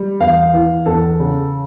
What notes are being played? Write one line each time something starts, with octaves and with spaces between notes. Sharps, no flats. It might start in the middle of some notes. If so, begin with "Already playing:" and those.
Already playing: G3
E2 F5
E3
E2 A4
C#3